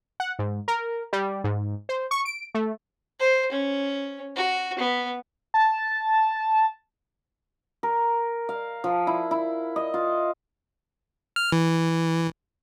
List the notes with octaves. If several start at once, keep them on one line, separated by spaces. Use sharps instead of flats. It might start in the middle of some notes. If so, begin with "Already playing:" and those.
F#5
G#2
A#4
G3
G#2
C5
C#6
D7
A3
C5
C#4
F#4
B3
A5
A#4
F5
F3
E4
E4
D#5
F4
F6
E3